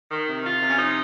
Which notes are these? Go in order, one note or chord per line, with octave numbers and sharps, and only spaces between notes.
D#3
C3
D#3 F4
C3
C#4
F3 D#4